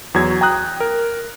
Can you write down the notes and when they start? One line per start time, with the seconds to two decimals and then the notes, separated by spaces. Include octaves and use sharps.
0.14 E2 F#3 G#6
0.41 G5 A#5 D#6 F#6
0.80 A#4